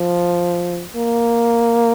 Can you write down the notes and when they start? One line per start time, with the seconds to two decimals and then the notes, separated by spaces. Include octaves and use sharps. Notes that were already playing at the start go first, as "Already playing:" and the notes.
Already playing: F3
0.95 A#3